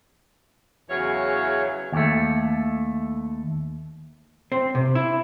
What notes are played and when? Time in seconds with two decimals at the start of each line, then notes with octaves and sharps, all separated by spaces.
0.90 E2 C#3 E3 F#3 C#5 F5
1.92 D#2 A3
4.52 C4
4.75 C3
4.95 E4